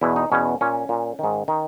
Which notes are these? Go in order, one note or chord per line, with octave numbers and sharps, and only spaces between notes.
E2 B2 E4
D#4
E2 B2 C#4
A#2 C#4
A#2
G#2 D#3
D#3